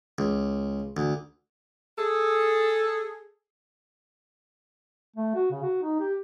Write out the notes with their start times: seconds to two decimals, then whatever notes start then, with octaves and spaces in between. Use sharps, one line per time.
0.18 C#2
0.97 D2
1.98 G#4 A4
5.17 A3
5.35 F#4
5.51 C#3
5.62 F#4
5.83 D#4
6.00 G4